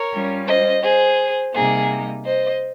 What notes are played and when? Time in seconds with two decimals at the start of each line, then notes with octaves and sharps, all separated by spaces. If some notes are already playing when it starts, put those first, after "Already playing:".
Already playing: A#4 C#5
0.13 G3 C#4 F4
0.47 C5 D#5
0.83 G#4 C5
1.54 C3 G3 A#3 D#4 G#4
2.24 C5 D#5